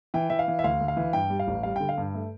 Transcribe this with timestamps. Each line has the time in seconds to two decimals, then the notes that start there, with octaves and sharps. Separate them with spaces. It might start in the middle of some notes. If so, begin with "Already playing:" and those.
0.14 E3 G5
0.30 E3 E5
0.39 F5
0.48 E3
0.59 E5
0.64 D2 F5
0.81 D2
0.88 F5
0.97 E3
1.13 G2 G5
1.30 G3
1.39 F5
1.47 A1
1.63 G3 F5
1.76 D3 G5
1.89 F5
1.98 G2
2.14 A3